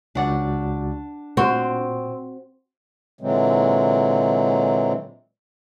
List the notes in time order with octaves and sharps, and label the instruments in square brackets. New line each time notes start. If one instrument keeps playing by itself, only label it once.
[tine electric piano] C#2 F#4 D5 [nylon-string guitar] D4 F#5
[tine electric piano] A#2 [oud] C4 [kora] F#4
[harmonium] A#2 D3 E3 F#3 G#3 C4